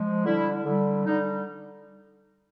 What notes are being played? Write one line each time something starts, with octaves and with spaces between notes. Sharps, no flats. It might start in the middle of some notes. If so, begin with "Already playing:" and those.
Already playing: F3 G#3
D3 G3 E4
D3 G3
D3 G3 D#4